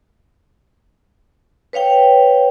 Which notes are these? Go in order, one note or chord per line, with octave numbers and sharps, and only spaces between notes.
B4 C#5 F5 G5